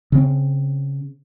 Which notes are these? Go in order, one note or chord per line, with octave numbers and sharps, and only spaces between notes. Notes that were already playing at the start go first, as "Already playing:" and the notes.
C#3 C4